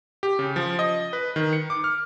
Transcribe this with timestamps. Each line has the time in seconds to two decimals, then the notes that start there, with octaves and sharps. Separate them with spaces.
0.23 G4
0.39 C#3
0.56 F3
0.79 D#5
1.13 B4
1.36 D#3
1.53 C#7
1.70 D6
1.84 F6